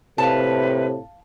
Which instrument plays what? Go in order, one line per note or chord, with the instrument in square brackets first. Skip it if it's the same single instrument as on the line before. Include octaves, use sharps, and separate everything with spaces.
[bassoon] A2 [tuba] C3 [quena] B4 [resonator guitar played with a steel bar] F5 A5